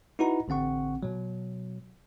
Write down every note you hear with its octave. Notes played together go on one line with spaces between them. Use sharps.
D#4 E4 F#4 B4 F#5 A#5
A1 D3 C4 F#5 C#6
B2 F#3